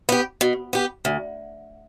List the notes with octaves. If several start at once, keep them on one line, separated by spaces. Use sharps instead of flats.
B3 G4
B2
B3 G4
D2